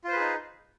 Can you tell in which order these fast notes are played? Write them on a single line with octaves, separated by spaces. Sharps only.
F4 C5 B4 G#4 D#4